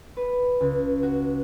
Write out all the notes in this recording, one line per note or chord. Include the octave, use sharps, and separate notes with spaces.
B4
C#2
F#4